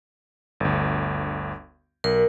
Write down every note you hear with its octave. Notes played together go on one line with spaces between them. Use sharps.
G1 D2
B1 A#4